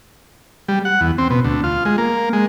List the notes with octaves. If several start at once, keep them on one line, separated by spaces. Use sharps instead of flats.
G3
F#5
E2
C4
B2
D2
F4
G#3
A#3
G#3